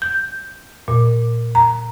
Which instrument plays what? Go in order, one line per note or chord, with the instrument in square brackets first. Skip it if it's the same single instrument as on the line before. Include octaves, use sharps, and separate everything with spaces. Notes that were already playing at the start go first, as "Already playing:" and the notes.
[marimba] G6
A#2
A#5